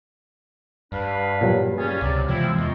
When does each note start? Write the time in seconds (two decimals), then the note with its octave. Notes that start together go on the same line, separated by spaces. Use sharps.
0.92 G2 D4 B4 F5
1.41 A#2 F#3 G3
1.78 G3 C#4 F4 G#4
2.01 C#2 C3 F#3 D5
2.28 C3 E3 F3 G#3 C4 E4
2.58 E2 D#4 F4 F#4